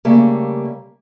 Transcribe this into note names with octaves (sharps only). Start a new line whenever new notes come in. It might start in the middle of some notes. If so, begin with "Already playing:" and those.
C#3 G3 A3 A#3